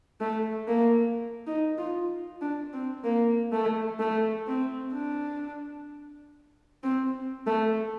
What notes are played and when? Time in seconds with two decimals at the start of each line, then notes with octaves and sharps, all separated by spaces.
0.20 A3
0.67 A#3
1.46 D#4
1.77 F4
2.41 D4
2.73 C4
3.04 A#3
3.52 A3
3.99 A3
4.47 C4
4.93 D4
6.83 C4
7.47 A3